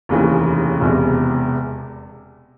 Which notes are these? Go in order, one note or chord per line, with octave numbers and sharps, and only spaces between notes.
F1 D#2 C#3 E3
E1 E2 C3